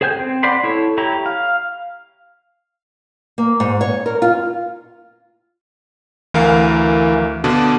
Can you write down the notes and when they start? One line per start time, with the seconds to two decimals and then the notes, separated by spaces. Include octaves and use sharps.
0.01 G#4 C5 G5 G#5 G6
0.20 C4
0.43 C5 D5 F#5 B5 C6
0.64 E4 A4 C#5
0.98 E4 G4 C#5 A#5
1.26 F5
3.38 A#3
3.60 G#2
3.81 C#5
4.06 A#4
4.22 F4
6.34 D2 E3 A#4 F5
7.44 B2 D3 D4